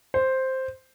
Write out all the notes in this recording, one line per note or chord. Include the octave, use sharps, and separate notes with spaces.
C5